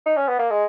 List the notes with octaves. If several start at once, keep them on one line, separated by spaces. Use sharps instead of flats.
D#4
C#4
B3
A#3
G#3